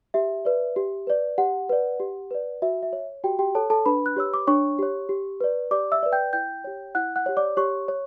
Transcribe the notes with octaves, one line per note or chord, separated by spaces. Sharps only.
G4 E5
B4 D5
G4
B4 D5
G4 F#5
B4 D5
G4
B4 D5
F#4 E5
E5
C#5
F#4 G4 G5
G4 G5
A4 C#5 A5
A4 A5
D4 B4 B5
F#6
G4 C#5 E6
D6
D4 C#5 C#6
G4 C#5
G4
B4 D5
G4 D5 D6
E5 E6
B4 D5
G5 G6
E4 G5 G6
G4 C#5
E4 F#5 F#6
F#5 F#6
G4 C#5
D5 D6
G4 C#5 C#6
C#5